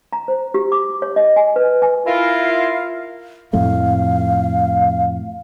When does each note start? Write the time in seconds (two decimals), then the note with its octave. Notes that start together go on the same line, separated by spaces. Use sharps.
0.13 A#5
0.28 C5
0.54 G4
0.72 D6
1.02 C#5
1.16 D#5
1.36 G#5
1.56 B4
1.82 G#5
2.06 E4 F4 A#4 F5
3.53 F2 A2 A3 F5